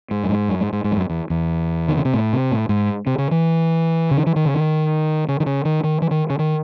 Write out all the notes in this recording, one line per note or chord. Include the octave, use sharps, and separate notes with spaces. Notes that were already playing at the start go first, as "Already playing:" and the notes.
G#2
F#2
G#2
F#2
G#2
G#2
G#2
E2
F#2
E2
E2
D#3
C#3
C3
A2
C3
A2
G#2
C3
C#3
E3
C#3
D#3
E3
D#3
C#3
D#3
C#3
D#3
C#3
D#3
D#3
E3
D#3
C#3
D#3